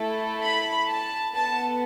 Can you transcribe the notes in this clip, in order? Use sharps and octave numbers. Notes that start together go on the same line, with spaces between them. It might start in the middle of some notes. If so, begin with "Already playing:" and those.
Already playing: A3 E4 A4
B5
A5
B3 A4 A5